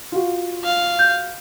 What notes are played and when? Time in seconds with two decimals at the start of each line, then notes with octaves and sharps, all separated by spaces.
0.12 F4 F#4
0.64 F5
0.99 G6